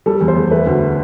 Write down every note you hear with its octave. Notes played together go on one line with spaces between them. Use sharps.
G3 A4
E2
C5
E2
A3 B4
D2